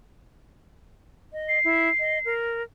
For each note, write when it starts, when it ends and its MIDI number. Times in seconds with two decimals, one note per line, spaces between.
1.33 1.59 75
1.49 2.34 96
1.64 1.89 64
1.99 2.19 75
2.25 2.63 70